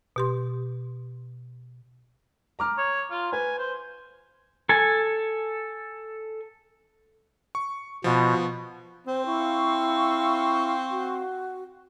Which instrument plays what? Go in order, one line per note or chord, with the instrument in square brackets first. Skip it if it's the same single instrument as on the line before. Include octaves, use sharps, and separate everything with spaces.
[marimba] B2 G4 C6
[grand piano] A#5 D6 F6
[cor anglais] C#5
F4
[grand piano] B4 [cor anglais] G#5
[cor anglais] C5
[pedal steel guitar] A4 G#5
[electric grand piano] C#6
[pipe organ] B2 [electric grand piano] F3 B3
[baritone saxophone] C4 [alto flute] C5
[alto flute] E4 [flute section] F5 C#6
[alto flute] F#4